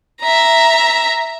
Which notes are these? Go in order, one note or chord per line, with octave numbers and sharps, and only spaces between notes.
E5 A#5